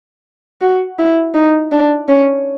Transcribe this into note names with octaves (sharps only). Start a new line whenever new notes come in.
F#4
E4
D#4
D4
C#4